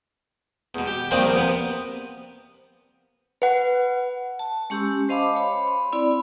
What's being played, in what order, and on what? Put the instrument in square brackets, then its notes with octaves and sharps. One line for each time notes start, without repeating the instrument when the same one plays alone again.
[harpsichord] E2 B2
G4
D#3 F3 G3 A#3 C4 D4
A#1 A#4
C3 B3
[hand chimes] B4 F#5
[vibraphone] A5
G#3 C#4 G4 C6 E6
C5 D#5 F5 A5 B5 D6
C#5 B5
C6
C4 E4 D5 B5